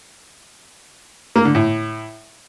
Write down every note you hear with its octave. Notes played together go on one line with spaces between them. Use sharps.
A#3
D3
A2